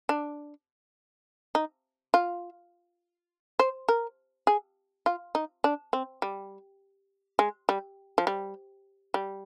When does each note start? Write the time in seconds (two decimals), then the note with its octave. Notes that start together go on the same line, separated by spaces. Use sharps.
0.09 D4
1.55 D#4
2.14 F4
3.59 C5
3.89 A#4
4.47 G#4
5.06 F4
5.35 D#4
5.64 D4
5.93 C4
6.22 G3
7.39 G#3
7.69 G3
8.18 F3
8.27 G3
9.14 G3